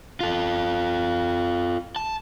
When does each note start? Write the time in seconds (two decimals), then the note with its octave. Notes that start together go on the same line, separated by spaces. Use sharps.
0.20 F4 A4
1.96 A5